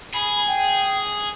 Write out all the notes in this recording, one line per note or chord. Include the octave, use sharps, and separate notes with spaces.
G#4 B5
G5